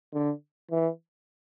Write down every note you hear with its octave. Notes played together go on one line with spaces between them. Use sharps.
D3
E3